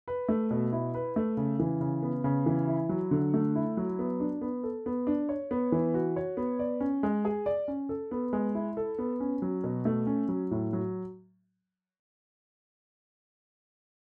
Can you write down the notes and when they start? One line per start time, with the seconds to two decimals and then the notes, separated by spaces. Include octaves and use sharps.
0.08 B4
0.29 A3
0.51 B2
0.72 E4
0.94 B4
1.16 A3
1.37 C#3
1.60 E3
1.81 C#3
2.03 B3
2.24 C#3
2.46 E3
2.68 E4
2.89 F#3
3.11 D3
3.34 A3
3.55 E4
3.77 F#3
3.99 B3
4.20 D4
4.41 B3
4.63 A4
4.86 B3
5.07 D4
5.29 C#5
5.51 B3
5.72 E3
5.94 F#4
6.16 C#5
6.37 B3
6.59 D5
6.80 C#4
7.03 G#3
7.25 G#4
7.46 D5
7.68 C#4
7.89 A4
8.11 B3
8.33 G#3
8.55 E4
8.77 A4
8.98 B3
9.20 C#4
9.42 F#3
9.64 B2
9.85 A3
10.07 C#4
10.29 F#3
10.51 A2
10.73 F#3